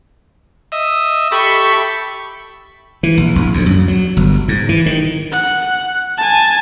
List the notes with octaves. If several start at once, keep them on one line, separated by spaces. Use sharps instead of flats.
D#5 E5
G4 A4 E5 B5 C#6
E3
A#1
A#1
D2
F#2
F#3
G1
G#2
E3
D#3
F#5
G#5 A5